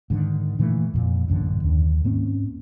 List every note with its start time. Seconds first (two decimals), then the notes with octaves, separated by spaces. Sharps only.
0.10 G#2 D3 D#3
0.59 A#2 E3 G3 A3
0.94 F2 A#2
1.28 A1 F#2 D3
1.63 D#2
2.04 G#2 A#3 C4 C#4